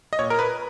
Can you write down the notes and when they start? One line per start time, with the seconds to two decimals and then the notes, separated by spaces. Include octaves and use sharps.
0.13 D#5
0.19 A#2 C#5
0.30 A#4
0.39 B4